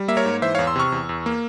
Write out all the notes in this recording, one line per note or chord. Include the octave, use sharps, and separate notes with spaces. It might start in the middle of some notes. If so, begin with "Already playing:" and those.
Already playing: G3
A#3 E5
A#4 C#5
G#2
E3 C5 E5
C#5 F5
E2
C6 E6
C3 C#6 F6
E2
E2
A#3